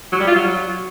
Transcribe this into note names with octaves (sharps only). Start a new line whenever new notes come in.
F#3
G3
F4
F#3